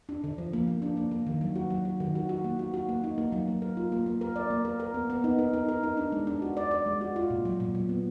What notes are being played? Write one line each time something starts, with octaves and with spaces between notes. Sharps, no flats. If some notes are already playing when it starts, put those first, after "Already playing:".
D4
D3
F3
A#3
A#3
D4
A#3
A#3
D#3
F#3
F#4
F#3
F#4
D#3
F#4
F#4
A#3
F#4
F#4
A#3
D#4
A#3
F#3
A#3
A#4
F4
A#3
A#3
A#4
D5
A#3
A#4
A#4
B3
B3
D#4
A#4
D#4
A#4
D#4
D4
G#3
D4
F#4
D5
D5
G#3
F#4
F4
A#2
F#3
A#2
F#3
B3